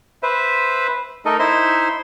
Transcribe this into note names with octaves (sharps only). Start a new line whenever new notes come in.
B4 C5 E5
A3 D#4 A4 A#4 D#5
D#4 E4 C5 E5 C6